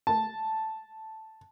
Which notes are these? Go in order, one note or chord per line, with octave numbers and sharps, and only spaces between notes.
A5